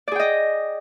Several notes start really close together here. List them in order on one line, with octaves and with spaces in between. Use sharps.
D5 G#4 G5 D#5